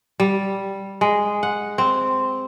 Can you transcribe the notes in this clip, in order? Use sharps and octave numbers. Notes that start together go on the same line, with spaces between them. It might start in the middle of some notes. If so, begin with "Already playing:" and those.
G3
G#3
F#5
C4